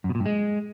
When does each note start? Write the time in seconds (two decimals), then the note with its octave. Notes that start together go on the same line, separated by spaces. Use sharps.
0.04 F#2
0.10 B2
0.15 A#2
0.20 G2
0.26 G#3